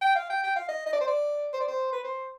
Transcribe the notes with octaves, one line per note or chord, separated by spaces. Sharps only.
G5
F5
G5
G5
F5
D#5
D#5
D5
C5
D5
C5
D5
C5
B4
C5